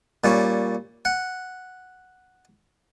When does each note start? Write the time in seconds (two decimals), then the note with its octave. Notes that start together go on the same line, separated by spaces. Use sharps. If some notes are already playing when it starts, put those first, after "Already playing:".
0.24 A#2 G3 C#4
1.05 F#5